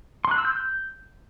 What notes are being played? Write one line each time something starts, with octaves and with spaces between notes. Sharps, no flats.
C6
F#6
E6
G6